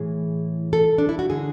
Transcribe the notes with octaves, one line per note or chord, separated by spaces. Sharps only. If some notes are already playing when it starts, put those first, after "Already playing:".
Already playing: A2 E3 G#4
A4
D4
E4
F#4
D3 G#4